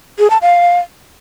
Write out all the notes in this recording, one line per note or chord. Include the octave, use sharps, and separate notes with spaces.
G#4
A5
F5